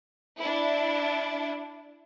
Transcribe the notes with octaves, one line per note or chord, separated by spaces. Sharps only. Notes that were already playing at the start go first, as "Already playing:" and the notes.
D4 E4